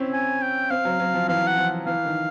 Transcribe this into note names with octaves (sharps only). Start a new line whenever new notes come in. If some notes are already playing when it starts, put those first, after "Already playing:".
Already playing: C4 C#4 E4
G#5
G5
C4 F5
F#3
F#3
F3
E3 F5
F#5
F3
E3 F5
D#3